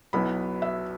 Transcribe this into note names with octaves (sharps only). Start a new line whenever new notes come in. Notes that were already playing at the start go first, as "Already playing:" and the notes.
B1 B2 F#3 B3 E4 B5
E5